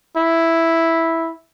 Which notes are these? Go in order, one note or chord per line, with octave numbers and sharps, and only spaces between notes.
E4